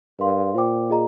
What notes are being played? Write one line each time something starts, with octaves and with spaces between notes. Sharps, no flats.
G2 A#4 F5 C6
A#2 F4 C5 G5 D6
F4 G#4 D#5 A#5